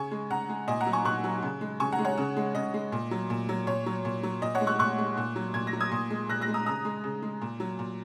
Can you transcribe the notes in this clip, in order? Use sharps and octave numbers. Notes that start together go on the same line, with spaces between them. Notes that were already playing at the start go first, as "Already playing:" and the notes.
Already playing: C#3 G#5 C#6
G#3
C#3 F#5 A#5
G#3
A#2 D#5 G#5
F#5 A#5
F#3
G#5 C#6
A#2 C#6 F#6
F#3
C#3
G#3
C#3 G#5 C#6
F#5 A#5
G#3
C#5 F#5
C#3
G#3
C#3 D#5
G#3
A#2
F#3
A#2
F#3
A#2 C#5
F#3
A#2
F#3
A#2 D#5
C#5 F#5
G#3
C#6 F#6
A#2 C#6 F#6
G#3
A#2
F#3
A#2 G#6
A#6
F#3
D#6 G#6
A#2
G#3
A#2 F#6 A#6
F#6 A#6
G#3
A#5 D#6
C#3 A#5 D#6
G#3
C#3
G#3
A#2
F#3
A#2